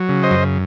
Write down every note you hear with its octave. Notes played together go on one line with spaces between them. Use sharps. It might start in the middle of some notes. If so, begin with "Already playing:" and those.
Already playing: F#3
C#3
C5 D#5
F#2